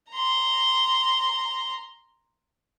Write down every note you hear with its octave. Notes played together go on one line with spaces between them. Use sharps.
A#5 C6